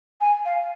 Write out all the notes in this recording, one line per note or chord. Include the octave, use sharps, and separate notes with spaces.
G#5
F5